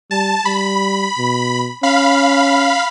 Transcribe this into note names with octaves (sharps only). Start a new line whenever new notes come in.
G3 A5
G3 B5
B2
C#4 F5 B5